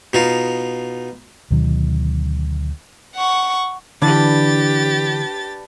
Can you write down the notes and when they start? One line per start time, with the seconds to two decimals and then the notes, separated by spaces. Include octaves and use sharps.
0.13 B2 D#4 F4
1.51 D2 B2 D#3 F#3
3.15 F#5 C#6
4.02 D3 E3 D4 G4 B4 A6